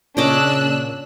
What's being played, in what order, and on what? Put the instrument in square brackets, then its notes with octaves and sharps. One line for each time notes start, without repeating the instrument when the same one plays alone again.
[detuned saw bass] A#2 [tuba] C#3 [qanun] C#4 D#5 D6 [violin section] D4 E6 F#6